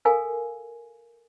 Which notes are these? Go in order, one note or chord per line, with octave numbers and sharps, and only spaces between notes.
A4 A#4 F5 G#5